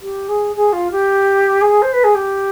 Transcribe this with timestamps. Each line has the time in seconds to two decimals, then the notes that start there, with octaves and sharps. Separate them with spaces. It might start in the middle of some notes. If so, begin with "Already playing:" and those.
0.02 G4
0.29 G#4
0.56 G#4
0.73 F4
0.92 G4
1.61 G#4
1.82 C5
1.93 B4
2.04 G#4
2.15 G4